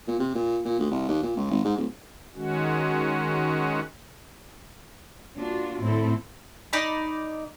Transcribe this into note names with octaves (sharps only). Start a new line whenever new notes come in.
A#2
C3
A#2
A#2
D2
C2
D#2
A#2
C#2
G#1
G#2
D1
D#3 G#3 C#4 F#4
A#3 D4 F4 F#4
A2 D3 C4 E4 A4
D#4 D5 B5